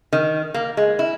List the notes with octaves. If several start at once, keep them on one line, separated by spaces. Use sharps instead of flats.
D#3
A#3
G#3
E4